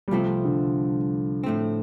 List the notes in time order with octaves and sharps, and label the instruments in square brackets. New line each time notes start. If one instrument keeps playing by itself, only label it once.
[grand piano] G3
[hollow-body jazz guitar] C2 C3 A3 C4 [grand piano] F3
[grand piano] D3
[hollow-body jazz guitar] A2 A3 C4